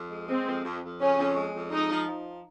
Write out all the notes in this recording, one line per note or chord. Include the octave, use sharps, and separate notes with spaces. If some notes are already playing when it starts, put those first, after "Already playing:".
Already playing: F2
G#3
G#3 C4
F2
F2
F2
C#3 C#4
F2
G#3
F2
G#3 D#4
F3
F3